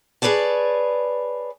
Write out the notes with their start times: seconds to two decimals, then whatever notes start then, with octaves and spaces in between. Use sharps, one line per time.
0.22 G#4 B4 C#5 D5 A5